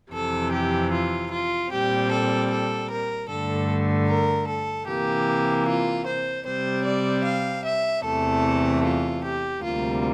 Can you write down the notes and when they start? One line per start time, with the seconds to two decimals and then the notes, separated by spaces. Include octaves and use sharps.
0.12 F2 C3 E3 A4
0.52 G4
0.91 F4
1.31 F4
1.71 A#2 G3 C4 G4
2.11 A4
2.50 A4
2.90 A#4
3.29 G2 D3 A3 A4
4.08 A#4
4.48 A4
4.87 C3 E3 A#3 G4
5.67 F4
6.07 C5
6.46 C3 G3 C4 C5
6.86 D5
7.25 F5
7.65 E5
8.04 E2 C3 E3 A3 A4
8.84 F4
9.24 G4
9.63 D2 C3 G3 A#3 F4